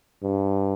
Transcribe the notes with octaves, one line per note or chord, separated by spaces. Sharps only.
G2